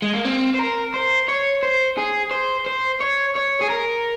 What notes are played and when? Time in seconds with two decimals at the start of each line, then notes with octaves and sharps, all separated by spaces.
0.02 G#3
0.14 A#3
0.25 C4
0.54 C5
0.59 A#4
0.94 C5
1.28 C#5
1.63 C5
1.97 G#4
2.31 C5
2.66 C5
3.00 C#5
3.35 C#5
3.61 G#4
3.69 A#4